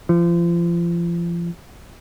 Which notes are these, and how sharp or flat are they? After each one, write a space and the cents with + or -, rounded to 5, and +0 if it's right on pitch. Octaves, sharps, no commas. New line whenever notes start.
F3 -35